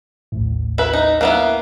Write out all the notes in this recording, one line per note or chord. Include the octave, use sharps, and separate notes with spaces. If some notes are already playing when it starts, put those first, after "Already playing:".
A1 D#2 A2
E4 B4
D#4
A#3 B3 E4 F#6